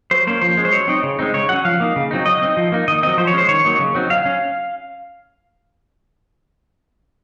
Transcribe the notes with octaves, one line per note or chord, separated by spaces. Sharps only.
F#3 C5
A#3 C#4 C5
F3 C5
G#3 C#4
C5
F#3 C#5
C4 D#4
C#3
G#3 C4 D#4
C#3 C#5
F#3 C#4 F#5
F3 F5
A#3 D#4
C#3
F#3 C4 D#4
F#3 D#5
C4 D#4
F3
A#3 D#4
D#3 D#5
F#3 C4 D#5
F3 C5
C#5
G#3 C#4 C5
D#3 C#5
F#3 A#3 D#4
C#3
F#3 C4 D#4
F#3 F5
C#4